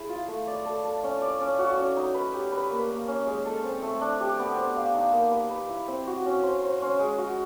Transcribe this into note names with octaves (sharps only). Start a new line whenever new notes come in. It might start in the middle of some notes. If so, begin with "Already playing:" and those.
Already playing: E4 G#4
F4
A3
D5
A4
A4
C#4
D5
C#4
F#4
C#4
D#4
B4
G4
B4
A#3
A#3
C#4
G#3
A4
C4
A3
D4
G4
B3
C5
F5
D#4
A#3
B4
B4
E4
C4
F#4
C#4
C5
C5
C#4
G#3
F#4